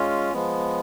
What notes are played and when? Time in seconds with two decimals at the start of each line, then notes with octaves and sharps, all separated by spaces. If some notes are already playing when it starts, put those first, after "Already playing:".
Already playing: G#3 C#4 F4
0.33 F3 G#3 B3